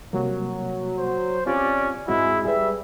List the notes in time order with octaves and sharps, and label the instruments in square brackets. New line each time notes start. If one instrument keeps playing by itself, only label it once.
[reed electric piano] C3 G3 A#3 [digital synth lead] F#3
[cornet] C5
[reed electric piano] C4 F4 G4 [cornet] C#4 [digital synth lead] D5
[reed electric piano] G#2 C4 F#4 [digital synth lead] G#3 [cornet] E4
[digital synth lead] G3 [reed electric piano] G#4 B4 [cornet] E5